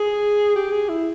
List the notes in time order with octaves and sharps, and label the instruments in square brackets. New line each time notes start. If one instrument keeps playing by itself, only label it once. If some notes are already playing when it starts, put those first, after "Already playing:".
Already playing: [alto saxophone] G#4
G4
G#4
E4